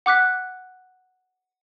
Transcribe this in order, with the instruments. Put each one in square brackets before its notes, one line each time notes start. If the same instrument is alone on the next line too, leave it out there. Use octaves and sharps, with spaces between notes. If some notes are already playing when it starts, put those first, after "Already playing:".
[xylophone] F#5 D6 F#6 B6